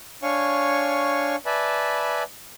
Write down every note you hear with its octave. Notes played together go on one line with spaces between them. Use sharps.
D4 C#5 F5 G#5 C#6
B4 D5 E5 G#5 A5 B5